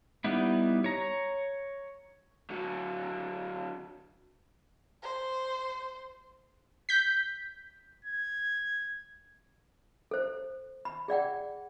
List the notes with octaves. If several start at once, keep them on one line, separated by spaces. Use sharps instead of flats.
G3 B3 D#4 E4
C#5 A#5
D3 F#3
C5
G6 B6
G#6
A4 C5
B5
G#4 D5 F#5 G5